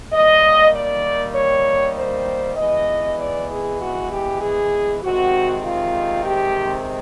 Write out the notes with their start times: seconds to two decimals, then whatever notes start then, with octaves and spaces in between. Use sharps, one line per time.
0.12 D#3 G3 A#3 D#5
0.73 D5
1.34 C#5
1.96 C5
2.57 E3 G#3 B3 D#5
3.18 D5
3.49 G#4
3.80 F#4
4.10 G4
4.41 G#4
5.02 C3 D#3 G#3 C4 F#4
5.64 F4
6.24 G4